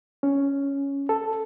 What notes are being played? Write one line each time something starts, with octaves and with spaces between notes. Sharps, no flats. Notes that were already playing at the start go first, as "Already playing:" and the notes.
C#4
A4